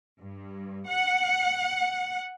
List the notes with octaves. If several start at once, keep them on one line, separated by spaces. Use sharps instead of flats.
G2
F#5